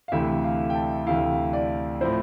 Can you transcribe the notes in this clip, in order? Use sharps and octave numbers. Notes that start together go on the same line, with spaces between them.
F5
D2 C3 E3 A3 E4 E5
F5
G5
A5
D2 C3 E3 A3 E4 F5
D5
A2 F3 C4 E4 C5